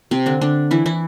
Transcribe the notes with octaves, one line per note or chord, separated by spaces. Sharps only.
C3 C4
D3 D4
D3 D4
E3 E4
E3 E4